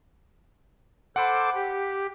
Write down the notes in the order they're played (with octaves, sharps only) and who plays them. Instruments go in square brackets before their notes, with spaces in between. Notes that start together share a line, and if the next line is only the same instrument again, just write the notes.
[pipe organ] A4 C5 D6 [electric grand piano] F#5 B5
[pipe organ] G4